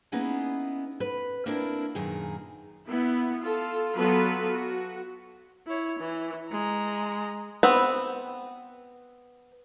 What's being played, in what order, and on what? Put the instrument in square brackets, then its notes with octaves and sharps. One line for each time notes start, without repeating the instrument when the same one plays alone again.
[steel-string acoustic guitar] A#3 B3 C#4 D#4 E4 G#4
B4
A#3 C4 D4 E4 F4 A#4
F#2 A#2 D#3 G#4 A#5
[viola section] B3 E4
F4 A4
F#3 B3 F4 F#4 A4 B4
F#4
[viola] E4 C#5
E3
G#3 A#5
[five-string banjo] B3 C4 B4